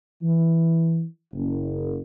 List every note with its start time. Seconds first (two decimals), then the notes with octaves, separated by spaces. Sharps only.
0.22 E3
1.32 F#1